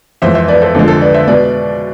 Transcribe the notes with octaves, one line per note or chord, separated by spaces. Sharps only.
F2 E3 G#3 C5 E5
C5 E5
B4 D5
A4 C5
F2 D3 F3 G#3 A4 C5
A4 C5
B4 D5
C5 E5
B2 G#3 B4 D5